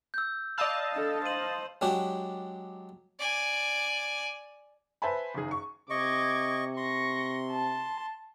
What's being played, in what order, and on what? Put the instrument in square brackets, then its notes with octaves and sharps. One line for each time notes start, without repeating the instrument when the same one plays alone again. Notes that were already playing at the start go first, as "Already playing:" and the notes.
[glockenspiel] E6 G6
[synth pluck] D5 E6 [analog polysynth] D#5 F5 A5 [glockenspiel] B5
[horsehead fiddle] D4 A4
[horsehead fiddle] C5 [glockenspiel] D#7 F#7
[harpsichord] F#3 G#3 D4 F#4 G4
[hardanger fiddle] D5 G#5
[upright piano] B4 C5 E5 G#5 A5 B5
F#1 D#3 G#4
C#6
[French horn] C3 [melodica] D#5 C#6 [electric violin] D6 G#6
[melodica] C6 [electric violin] C#6 A#6
[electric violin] A5